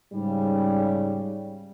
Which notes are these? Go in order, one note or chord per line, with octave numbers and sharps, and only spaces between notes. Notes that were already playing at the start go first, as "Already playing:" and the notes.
G#2 C#3 G3